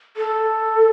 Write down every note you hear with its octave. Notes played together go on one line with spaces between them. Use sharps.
A4